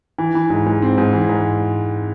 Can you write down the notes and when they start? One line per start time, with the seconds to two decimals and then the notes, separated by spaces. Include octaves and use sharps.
0.18 E3
0.35 E3
0.50 G#2
0.66 G#2
0.82 C4
0.98 G#2
1.13 E3
1.29 G#2